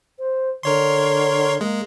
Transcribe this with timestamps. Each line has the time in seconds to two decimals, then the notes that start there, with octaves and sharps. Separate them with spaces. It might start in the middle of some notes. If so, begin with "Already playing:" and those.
0.19 C5
0.63 D3 A#4 C#5 C6
1.61 G#3 A#3